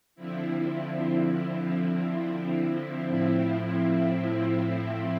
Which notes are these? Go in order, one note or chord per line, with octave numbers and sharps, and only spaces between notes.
D3 F3 C4 E4
A2 F3 C4 E4